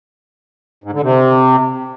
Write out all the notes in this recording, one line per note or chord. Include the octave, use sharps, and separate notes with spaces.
G#2
D3
C3